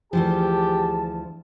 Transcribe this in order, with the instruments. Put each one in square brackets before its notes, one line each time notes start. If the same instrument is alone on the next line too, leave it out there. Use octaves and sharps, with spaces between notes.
[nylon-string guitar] D2 E3 F3 [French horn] G4 [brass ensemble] G#4 A5